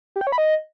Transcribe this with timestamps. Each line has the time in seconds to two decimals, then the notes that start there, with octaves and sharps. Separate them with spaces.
0.16 G4
0.21 G5
0.27 C#5
0.32 B5
0.38 D#5